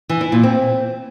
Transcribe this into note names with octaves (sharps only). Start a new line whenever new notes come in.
E3
E4
A#2
C4